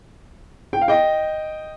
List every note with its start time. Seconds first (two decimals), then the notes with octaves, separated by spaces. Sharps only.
0.73 G5
0.81 F5
0.88 D#5 G5